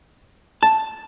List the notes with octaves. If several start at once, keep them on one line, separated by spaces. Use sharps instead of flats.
A5